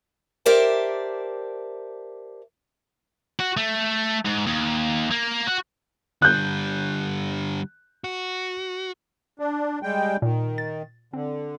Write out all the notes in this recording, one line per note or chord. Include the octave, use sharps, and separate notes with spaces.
G4 A#4 C5 D5 E5 A5
F#4
A3
G#2
D#2
A#3
F#4
D3 G3 F#6 G6
F#4
D4
G3 G#3 G5
A#2 D#3
A6
D3 C4